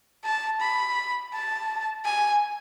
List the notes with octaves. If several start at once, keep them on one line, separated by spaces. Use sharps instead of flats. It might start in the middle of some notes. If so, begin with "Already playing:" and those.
A5
B5
A5
G#5